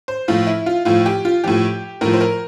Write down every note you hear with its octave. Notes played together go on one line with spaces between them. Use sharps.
C5
A2 F3 F4
E4
F4
A2 F3 F4
G4
F4
A2 F3 G4
A2 F3 A#4
C5
A#4